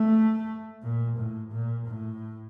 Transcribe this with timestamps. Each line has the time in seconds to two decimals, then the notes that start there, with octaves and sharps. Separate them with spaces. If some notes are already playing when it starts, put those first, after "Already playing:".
Already playing: A3
0.83 A#2
1.18 A2
1.53 A#2
1.86 A2